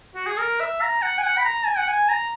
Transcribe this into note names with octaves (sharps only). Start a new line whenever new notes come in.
F#4
G#4
A#4
E5
A#5
F#5
G#5
F#5
B5
A#5
G#5
F#5
G#5
A#5